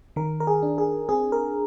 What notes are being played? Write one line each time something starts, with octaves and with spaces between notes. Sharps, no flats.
D#3 A#4
A#4
G#4
D4
G#4
C4 G#4
A#4